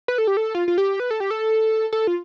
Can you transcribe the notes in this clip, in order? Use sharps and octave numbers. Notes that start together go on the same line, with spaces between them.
B4
A4
G4
A4
F4
F4
G4
B4
A4
G4
A4
A4
F4